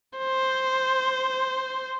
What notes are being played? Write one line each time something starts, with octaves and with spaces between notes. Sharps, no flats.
C5